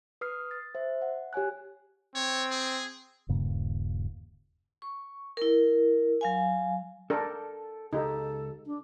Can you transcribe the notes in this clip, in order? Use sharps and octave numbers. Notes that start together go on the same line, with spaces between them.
B4 D#6 F6 C7
A6
C5 E5
F#5
G4 C#5 G#5 F#6
C4 C#5
G#4
D#1 G2 C#3 A#3
C#6
E4 A#4
F#3 F5 G#5
D4 A4 A#4 G5 A5
C#2 D#4 G4 A4
D4